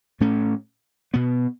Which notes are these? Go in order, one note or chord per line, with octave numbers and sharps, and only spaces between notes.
A2 A3 C#4
B2 B3